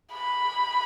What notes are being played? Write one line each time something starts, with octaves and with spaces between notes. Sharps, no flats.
B5